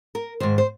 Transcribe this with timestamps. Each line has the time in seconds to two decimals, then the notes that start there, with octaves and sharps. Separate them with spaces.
0.15 A#4
0.40 G#2 D#3 C5
0.58 C5